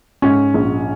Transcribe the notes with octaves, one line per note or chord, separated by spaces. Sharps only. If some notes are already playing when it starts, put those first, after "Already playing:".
G#2 C#4
A#1